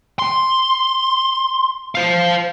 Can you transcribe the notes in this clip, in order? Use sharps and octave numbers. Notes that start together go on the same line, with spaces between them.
C6
C5 F5